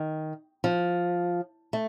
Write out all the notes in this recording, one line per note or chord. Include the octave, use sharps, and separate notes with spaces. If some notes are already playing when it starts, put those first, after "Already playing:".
Already playing: D#3
F3
A3